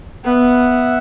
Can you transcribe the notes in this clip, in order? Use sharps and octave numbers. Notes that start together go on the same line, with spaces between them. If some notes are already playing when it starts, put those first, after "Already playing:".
B3 E5 F#5